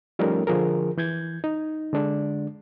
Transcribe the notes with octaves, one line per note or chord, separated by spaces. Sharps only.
F3 G3 A3 C#4 D#4 A#4
D3 F3 G#4 A#4
E3 G6 G#6
D#4
D3 G#3 D4